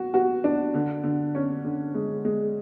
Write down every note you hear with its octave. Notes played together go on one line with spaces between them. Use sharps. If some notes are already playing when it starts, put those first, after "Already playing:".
Already playing: F#4
F#4
D4
D3
D3
C#4
D3
G#3
G#3